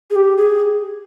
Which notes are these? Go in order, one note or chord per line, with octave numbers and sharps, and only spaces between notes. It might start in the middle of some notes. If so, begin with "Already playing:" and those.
G#4
G4
G#4